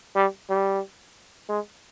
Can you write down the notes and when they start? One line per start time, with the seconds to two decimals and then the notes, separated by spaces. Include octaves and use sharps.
0.16 G3
0.50 G3
1.49 G#3